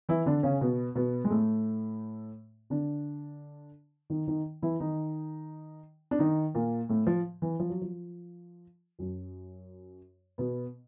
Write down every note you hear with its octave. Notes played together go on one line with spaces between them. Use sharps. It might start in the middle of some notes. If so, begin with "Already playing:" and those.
E3 E4
D3 D4
C#3 C#4
B2 B3
B2 B3
G#3
A2 A3
D3 D4
D#3 D#4
D#3 D#4
E3 E4
D#3 D#4
D4
D#3 D#4
A#2 A#3
A2 A3
F3
E3
F3
F#3
F3
F#2 F#3
B2 B3